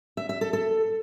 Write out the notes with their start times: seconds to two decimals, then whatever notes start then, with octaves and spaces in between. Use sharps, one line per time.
0.17 E5
0.29 E5
0.41 A4
0.53 A4